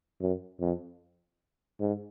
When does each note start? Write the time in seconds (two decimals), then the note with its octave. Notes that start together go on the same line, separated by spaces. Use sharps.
0.21 F#2
0.60 F2
1.80 G#2